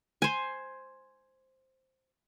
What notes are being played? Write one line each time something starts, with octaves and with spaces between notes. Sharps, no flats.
C5 G#5